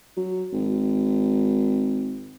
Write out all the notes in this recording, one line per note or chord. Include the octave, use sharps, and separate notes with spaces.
F#3
G#1